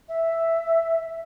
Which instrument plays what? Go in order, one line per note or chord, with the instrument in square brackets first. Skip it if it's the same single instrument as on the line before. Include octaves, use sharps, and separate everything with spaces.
[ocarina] E5